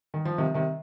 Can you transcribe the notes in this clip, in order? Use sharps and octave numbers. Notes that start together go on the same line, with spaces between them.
D#3
F3
C3 D#3
C3 D#3